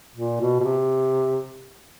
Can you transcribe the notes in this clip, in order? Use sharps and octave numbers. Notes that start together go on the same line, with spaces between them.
A#2
B2
B2
C3